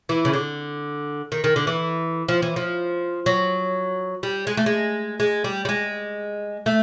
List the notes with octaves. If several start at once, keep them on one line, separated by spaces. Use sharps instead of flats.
E3
C#3
D3
D#3
D#3
D3
E3
F3
E3
F3
F#3
G3
G#3
A3
G#3
G#3
G3
G3
G#3
A3